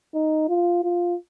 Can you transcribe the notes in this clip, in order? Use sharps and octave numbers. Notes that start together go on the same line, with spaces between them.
D#4
F4
F4